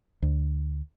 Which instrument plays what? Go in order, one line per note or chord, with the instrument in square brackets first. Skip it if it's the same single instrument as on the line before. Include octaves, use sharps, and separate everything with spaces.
[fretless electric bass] D2